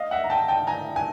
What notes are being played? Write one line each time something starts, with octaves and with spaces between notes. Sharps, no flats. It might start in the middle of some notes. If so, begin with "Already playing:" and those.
Already playing: D#5 F5
E5 F#5
A#5
G5 A5
G5 A5
G#5 A#5
G#5